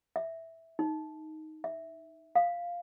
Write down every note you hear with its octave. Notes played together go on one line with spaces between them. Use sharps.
E5
D#4
E5
F5